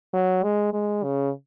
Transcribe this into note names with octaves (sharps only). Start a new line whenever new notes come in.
F#3
G#3
G#3
C#3